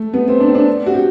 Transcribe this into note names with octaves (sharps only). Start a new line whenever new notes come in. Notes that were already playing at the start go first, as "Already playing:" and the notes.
Already playing: A3
B3
C4
D4
C4
D4
F#4
G4